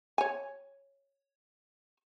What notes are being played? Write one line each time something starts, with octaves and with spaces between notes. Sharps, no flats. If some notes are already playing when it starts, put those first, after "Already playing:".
C#5 G#5